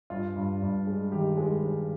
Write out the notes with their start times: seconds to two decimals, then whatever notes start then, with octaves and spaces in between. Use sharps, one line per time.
0.10 G2 F4
0.36 G2
0.62 G2
0.87 G#3
1.12 D#3 G4
1.37 G#3
1.63 G#3